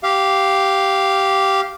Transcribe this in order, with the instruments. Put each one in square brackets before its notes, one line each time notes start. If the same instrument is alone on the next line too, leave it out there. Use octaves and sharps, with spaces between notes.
[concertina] G4 F5